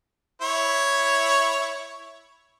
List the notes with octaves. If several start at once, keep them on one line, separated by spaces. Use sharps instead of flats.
E4 C#5